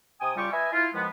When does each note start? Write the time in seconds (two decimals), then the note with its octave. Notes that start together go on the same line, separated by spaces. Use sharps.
0.21 C3 G5 G#5 D#6
0.36 C#3 G3 F4 G4 C#6
0.52 B4 D#5 E5 G#5
0.72 E4 F4
0.94 D#2 F3 G#3 B3